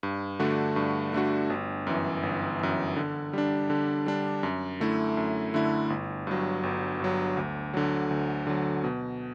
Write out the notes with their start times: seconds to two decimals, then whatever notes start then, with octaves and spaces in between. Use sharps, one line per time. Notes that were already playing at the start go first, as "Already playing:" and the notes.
0.03 G2
0.39 D3 A3 D4 F#4
0.76 G2
1.13 D3 A3 D4 F#4
1.50 G1
1.87 F#2 E3
2.23 G1
2.60 F#2 E3
2.96 D3
3.33 G3 D4
3.70 D3
4.06 G3 D4
4.43 F#2
4.80 D3 A3 E4
5.17 F#2
5.54 D3 A3 E4
5.90 G1
6.27 G2 F#3
6.63 G1
7.00 G2 F#3
7.37 D2
7.74 D3 F#3
8.11 D2
8.47 D3 F#3
8.84 B2